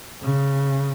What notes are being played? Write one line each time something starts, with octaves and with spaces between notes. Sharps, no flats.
C#3